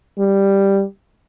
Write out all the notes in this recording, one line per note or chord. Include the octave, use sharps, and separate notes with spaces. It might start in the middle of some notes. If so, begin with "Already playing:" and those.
G3